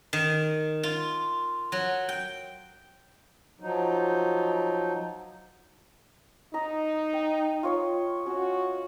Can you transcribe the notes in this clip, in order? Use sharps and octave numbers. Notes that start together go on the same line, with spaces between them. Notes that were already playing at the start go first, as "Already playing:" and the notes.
D#3
F4
F#3
G5
F3 F#3 D#4
D#4 D#5 A#5
G5
F4 C#5 D#6
C#4 F#4